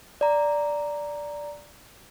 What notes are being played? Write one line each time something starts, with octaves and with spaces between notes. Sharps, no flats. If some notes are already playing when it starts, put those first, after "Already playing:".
D5 A#5